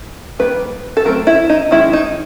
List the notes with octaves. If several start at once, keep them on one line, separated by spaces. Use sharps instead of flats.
D#3 G3 A#3 B4
A4
F#3 A3 C4 A#4
E4
D#4
D#3 G#3 C#4 E4
D#4